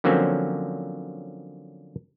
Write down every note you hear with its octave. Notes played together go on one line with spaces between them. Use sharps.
D3 F3 F#3 A#3 C4 C#4